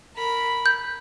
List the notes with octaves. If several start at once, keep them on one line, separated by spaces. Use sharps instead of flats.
A#4 B5
G6